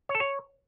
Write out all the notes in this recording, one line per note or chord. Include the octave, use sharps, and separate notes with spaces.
C#5
A4
C#5